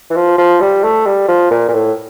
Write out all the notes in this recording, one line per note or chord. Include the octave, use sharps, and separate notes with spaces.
E3
F3
F3
G3
A3
G3
F3
A#2
A#2
A2